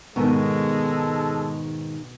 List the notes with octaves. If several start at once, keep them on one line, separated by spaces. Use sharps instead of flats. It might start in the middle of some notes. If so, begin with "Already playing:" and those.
G#2 B2 D#3 G#3 A4